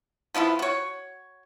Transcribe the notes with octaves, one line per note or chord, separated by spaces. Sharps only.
F3 B3 E4 F4
F#4 C#5